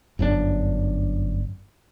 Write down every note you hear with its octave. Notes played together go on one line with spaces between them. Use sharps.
G1 F#2 A2 D4